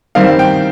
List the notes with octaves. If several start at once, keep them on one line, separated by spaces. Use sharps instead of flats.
D#3 G3 C4 F5
G5